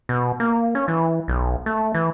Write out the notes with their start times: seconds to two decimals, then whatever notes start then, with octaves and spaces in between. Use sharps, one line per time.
0.09 B2
0.40 A#3
0.75 C#4
0.88 E3
1.28 B1
1.66 A3
1.94 E3